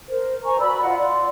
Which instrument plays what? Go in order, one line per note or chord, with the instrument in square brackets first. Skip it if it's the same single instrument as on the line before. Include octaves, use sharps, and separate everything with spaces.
[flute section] A#4 C5
C5 G#5 A#5 C#6
F#4 D5 B5 E6
F4 D#5 F#5
D5 C6